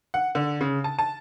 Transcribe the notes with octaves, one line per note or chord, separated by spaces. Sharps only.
F#5
D3
C#3
A5
A5